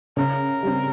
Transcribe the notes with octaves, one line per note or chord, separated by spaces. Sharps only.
C#3 A#4
G3 C4